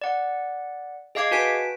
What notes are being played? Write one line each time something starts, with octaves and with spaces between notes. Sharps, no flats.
D5 F#5
G#4 D#5 F5 D6 G#6 C7
F#4 B4 G#5 A5 B6 D7